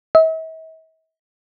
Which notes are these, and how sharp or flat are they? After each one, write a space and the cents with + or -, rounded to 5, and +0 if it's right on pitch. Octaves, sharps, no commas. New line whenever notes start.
E5 -45